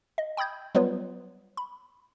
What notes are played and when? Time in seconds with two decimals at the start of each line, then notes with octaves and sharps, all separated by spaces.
0.18 D#5
0.37 G5 B5 D#6 G6 G#6
0.75 F#3 G3 B3 F4 B4 C#5
1.57 B5